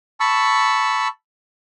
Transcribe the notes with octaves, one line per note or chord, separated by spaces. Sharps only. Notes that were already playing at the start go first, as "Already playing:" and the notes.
A5 B5 C#6 E6